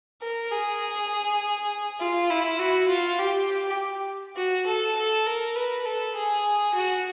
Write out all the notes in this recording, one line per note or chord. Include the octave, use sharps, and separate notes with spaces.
A#4
G#4
F4
E4
F#4
F4
G4
F#4
A4
A4
A#4
B4
A4
G#4
F#4